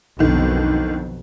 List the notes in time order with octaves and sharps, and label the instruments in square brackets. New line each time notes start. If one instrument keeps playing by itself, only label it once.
[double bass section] B1 F2 B2 [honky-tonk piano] D3 D#3